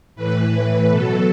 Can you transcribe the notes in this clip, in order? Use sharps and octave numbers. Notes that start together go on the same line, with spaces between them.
A2 E3 B4
B4
B2 F#3 A4